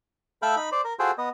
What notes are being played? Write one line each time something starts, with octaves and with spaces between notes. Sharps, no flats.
A3 A4 E5 F5 G5 B5
D#4 B5
C5 D5
A#4
F4 F#4 G#4 A4 C5 G5
B3 D#5